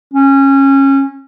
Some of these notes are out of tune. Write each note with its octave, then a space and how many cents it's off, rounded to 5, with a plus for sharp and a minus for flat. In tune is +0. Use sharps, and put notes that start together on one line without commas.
C#4 -20